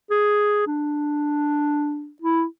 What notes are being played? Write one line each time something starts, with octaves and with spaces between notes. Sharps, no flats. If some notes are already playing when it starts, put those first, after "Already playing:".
G#4
D4
E4